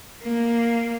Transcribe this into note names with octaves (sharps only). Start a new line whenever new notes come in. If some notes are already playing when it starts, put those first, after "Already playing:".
A#3